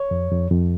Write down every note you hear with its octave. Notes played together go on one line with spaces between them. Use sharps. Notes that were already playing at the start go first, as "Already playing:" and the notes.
Already playing: C#5
F2
F2
F2